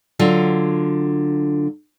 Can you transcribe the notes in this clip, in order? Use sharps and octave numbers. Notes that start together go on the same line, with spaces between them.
D3 F#3 F4